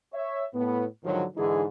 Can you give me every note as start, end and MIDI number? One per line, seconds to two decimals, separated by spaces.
0.14 0.44 73
0.14 0.44 76
0.54 0.86 45
0.54 0.86 59
1.04 1.24 44
1.04 1.24 50
1.04 1.24 51
1.04 1.24 53
1.04 1.24 54
1.36 1.64 44
1.36 1.64 50
1.36 1.64 52
1.36 1.64 56
1.36 1.64 63
1.36 1.64 68